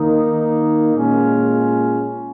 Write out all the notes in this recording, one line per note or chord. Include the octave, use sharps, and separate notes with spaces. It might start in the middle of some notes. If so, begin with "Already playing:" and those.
Already playing: D#3 A#3 D#4
A#2 G#3 C#4 F4